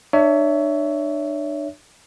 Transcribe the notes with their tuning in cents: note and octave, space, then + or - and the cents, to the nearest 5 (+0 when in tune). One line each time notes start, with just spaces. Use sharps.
D4 +35 C#5 +25 E5 +0